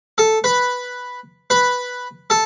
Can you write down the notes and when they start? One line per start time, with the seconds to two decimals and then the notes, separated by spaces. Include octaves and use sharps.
0.18 A4
0.44 B4
1.50 B4
2.30 A4